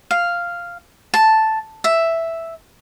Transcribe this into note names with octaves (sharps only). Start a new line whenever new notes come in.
F5
A5
E5